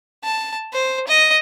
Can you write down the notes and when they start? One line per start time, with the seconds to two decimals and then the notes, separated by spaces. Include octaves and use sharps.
0.24 A5
0.73 C5
1.08 D#5